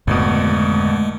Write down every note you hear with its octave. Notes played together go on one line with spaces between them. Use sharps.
G#1 F2 G#2 B2 D3 G#3 A3